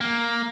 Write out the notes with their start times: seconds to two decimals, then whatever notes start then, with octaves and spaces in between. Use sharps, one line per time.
0.01 A#3